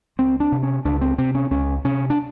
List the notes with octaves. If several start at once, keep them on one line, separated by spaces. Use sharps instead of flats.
C#2 C4
D4
C3
C#4
C#2 D4
C4
C3 C4
C#4
C#2 C#4
C3 C#4
D4